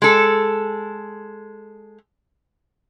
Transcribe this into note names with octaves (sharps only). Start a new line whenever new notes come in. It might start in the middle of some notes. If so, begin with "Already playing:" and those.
G#3 A4